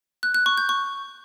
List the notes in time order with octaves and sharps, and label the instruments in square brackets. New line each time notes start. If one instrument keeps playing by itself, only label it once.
[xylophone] F#6
F#6
C#6
G6
C#6